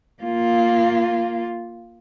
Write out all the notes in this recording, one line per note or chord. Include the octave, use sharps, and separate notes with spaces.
A#3 F4